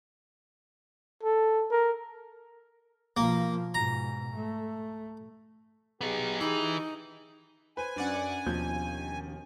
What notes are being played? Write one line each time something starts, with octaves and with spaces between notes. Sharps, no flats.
A4
A#4
B2 F3 A#3
G#2 B2 A#5
A3
B3 D#4 G4 G#4
E3 D#4
B4 C5 G#5
F#2 C#4 D4 D5 F#5
D#2 B2 F3 G6